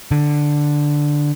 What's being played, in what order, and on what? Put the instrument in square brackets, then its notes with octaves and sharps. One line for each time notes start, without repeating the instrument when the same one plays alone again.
[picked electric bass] D3